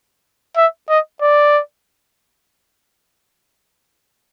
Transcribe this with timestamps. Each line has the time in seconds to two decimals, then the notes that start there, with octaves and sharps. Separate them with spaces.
0.57 E5
0.89 D#5
1.22 D5